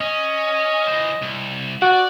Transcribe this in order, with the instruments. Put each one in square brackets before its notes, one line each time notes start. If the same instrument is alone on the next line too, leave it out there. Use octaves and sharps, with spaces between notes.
[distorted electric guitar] C#4 [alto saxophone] D#5
[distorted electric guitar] E3 C5
C2
[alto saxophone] F#4 [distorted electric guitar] D5